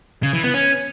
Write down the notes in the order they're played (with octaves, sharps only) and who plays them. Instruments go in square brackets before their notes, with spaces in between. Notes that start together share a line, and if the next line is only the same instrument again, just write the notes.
[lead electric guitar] C#3
E3
B3
C#4